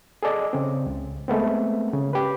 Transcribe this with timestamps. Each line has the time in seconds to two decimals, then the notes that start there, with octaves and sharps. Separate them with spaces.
0.23 G#4 A4 D5 D#5
0.53 C#3 C4
0.86 C#2
1.28 G#3 A3 B3 C4
1.93 C#3
2.13 G4 B4